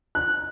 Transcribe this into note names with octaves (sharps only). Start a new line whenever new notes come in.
F#6